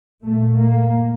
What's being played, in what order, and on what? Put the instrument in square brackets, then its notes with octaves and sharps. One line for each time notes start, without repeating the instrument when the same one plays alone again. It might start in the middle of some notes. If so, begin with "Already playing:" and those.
[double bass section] A#2 A3
A#3